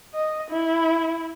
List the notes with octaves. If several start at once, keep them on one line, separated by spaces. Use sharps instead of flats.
D#5
E4